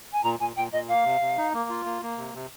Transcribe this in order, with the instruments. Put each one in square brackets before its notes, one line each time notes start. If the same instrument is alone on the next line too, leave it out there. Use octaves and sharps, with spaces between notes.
[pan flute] G#5
[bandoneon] A#2 [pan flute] A#5
[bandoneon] A#2 [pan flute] G#5
[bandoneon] A#2 [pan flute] G5
[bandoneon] A#2 [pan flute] D#5
[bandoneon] A#3 [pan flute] F5
[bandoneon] C3
C3
D#4
A#3
F4
A#3
A#3
C3
C3